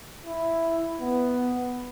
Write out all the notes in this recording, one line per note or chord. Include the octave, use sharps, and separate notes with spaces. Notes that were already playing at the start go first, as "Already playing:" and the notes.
E4
B3